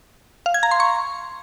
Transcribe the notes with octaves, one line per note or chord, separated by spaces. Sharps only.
F5
G#6
A#5
C6
C#6